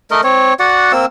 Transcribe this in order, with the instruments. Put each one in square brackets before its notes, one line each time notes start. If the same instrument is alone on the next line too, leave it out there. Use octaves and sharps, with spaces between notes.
[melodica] A3 A#4 D#5
C4 C#5
F#4 D5 F#5
A#3 C4 E6